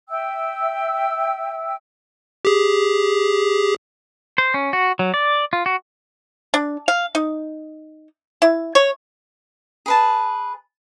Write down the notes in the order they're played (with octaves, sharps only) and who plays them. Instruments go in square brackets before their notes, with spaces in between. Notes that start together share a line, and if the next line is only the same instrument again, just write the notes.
[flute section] E5 G5 E6
[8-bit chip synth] G4 G#4
[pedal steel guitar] C5
C#4
F#4
F#3
D5
F4
F#4
[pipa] D4
F5
D#4
E4
C#5
[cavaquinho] G#4 B4 A5